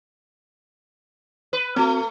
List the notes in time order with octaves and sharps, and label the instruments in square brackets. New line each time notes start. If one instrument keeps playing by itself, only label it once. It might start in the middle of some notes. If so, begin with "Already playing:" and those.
[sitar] B4
[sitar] A3 [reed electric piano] C4 F#4